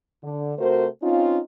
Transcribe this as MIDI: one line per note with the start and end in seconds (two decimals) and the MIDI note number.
0.24 0.54 50
0.58 0.86 48
0.58 0.86 57
0.58 0.86 66
0.58 0.86 70
0.58 0.86 72
1.03 1.39 60
1.03 1.39 61
1.03 1.39 63
1.03 1.39 65